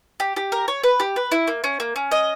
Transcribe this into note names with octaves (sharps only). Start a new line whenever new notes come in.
G4
G4
A#4
C#5
B4
G4
B4
E4
A#3
C#4
A#3
C#4
D#5